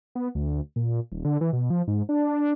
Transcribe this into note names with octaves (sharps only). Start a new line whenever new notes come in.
B3
D2
A#2
D#1
D3
E3
B2
F3
G#2
D4